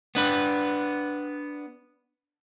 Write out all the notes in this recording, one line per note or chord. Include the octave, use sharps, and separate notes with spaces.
B3 D4 B4